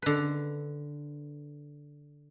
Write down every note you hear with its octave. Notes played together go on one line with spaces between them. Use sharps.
D3 B4